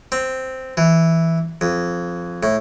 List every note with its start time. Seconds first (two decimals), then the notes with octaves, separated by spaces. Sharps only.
0.12 C4
0.77 E3
1.61 F2
2.43 A2